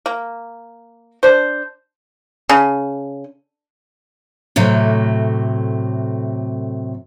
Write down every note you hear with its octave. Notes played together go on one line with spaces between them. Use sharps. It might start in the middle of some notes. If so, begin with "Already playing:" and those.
A#3
D4 C5
C#3
A2 C3 F#3 A3